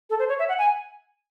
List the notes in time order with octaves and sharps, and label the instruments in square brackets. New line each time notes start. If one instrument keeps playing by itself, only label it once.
[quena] A4
C5
C#5
E5
F#5
G#5